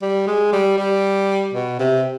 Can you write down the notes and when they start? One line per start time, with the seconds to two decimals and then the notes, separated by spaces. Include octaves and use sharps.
0.02 G3
0.27 G#3
0.53 G3
0.78 G3
1.54 B2
1.79 C3